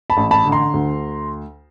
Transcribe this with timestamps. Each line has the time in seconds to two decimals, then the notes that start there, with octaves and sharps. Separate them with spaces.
0.10 A5 B5
0.17 A1
0.31 A5 B5
0.46 D3
0.52 A#5 C6
0.74 D2